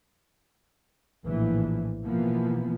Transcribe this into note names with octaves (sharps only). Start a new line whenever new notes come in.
A#1 A2 E3 F3
B2 E3 F3 A#3 B3